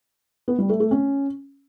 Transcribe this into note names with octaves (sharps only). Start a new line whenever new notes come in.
B3
G3
A3
A3
C#4